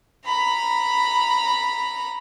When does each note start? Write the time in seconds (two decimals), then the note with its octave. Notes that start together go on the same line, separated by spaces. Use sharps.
0.25 A#5 B5